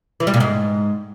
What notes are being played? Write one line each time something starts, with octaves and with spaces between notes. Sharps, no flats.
E3
G3
A#2
G#2